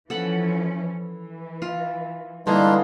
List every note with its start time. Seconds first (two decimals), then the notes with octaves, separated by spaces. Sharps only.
0.10 E3 F3 C#4 A4 F#5 B5
0.94 E3
1.62 F4
2.47 D3 E3 G3 G#3 A#3 D4 D#4 C6